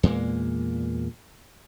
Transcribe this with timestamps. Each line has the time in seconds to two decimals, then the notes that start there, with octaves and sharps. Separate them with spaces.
0.03 E2 A#2 G#3 A#3